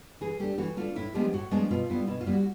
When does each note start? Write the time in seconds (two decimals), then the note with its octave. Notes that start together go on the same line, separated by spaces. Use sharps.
0.21 E3 G#4
0.40 A3 D4 G4
0.58 E3 F#4
0.77 A3 D4 F4
0.96 A2 E4
1.14 F3 G#3 B3 D4 G4
1.33 A2 F#4
1.51 F3 G#3 B3 D4
1.71 B2 F4
1.90 G3 B3 E4
2.07 B2 E4
2.21 F4
2.26 G3 B3 E4
2.33 F#4